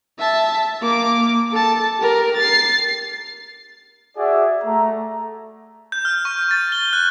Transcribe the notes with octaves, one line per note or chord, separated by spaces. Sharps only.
E5 A5
A#3 D6
A4 A5
G4 A#4
A6 C7
F#4 G#4 D5 E5
A3 A#5
G6
F6
C#6
A6
G7
F#6